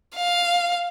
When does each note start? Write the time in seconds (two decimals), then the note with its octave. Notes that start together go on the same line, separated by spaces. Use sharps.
0.16 F5